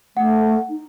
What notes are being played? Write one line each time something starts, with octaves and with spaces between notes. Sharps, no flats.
A3 F#5
D#4